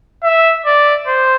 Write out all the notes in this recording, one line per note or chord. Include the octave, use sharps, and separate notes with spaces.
E5
D5
C5